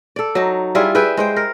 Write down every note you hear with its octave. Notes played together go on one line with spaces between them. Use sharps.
A4 D5
F#3 D#4
G3 E4 F4 G#4
G#4 B4 E5 G5
G#3 C5 G5
A#4